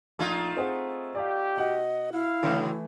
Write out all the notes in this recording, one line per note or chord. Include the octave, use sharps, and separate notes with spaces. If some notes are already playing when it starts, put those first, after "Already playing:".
A#1 A3 D#4 F4 G#6
C4 G#4 F#5
G4 D5 F5
B2 D#5 F#5
E4 F5
A2 C#3 E3 F#3 A3